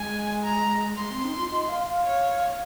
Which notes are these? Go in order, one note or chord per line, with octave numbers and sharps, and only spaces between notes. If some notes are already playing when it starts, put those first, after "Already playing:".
Already playing: G#3 G#5
A#5
G#3 C6
C4
D#4
F4
D#5
F5
F5
C#5